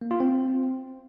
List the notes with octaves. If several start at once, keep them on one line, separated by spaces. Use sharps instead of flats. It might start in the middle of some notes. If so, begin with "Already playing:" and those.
A#3
F4
C4